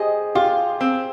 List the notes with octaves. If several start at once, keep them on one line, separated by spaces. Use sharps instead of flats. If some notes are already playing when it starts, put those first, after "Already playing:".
Already playing: G4 G#4 C5 D#5
F4 G4
C4